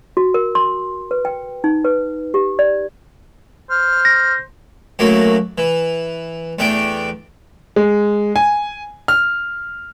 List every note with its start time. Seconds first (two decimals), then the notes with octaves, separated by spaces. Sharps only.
0.17 F#4
0.34 A#4
0.55 C6
1.11 B4
1.25 G5
1.64 D#4
1.84 B4
2.34 G4
2.59 D5
3.70 C5 F6
4.05 A#6
4.99 F#2 F#3 A3 A#3
5.58 E3
6.59 E2 A3 D4 G5
7.76 G#3
8.36 G#5
9.08 F6